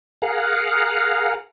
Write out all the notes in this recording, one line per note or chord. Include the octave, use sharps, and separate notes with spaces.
G#4 A#4 F5 F#5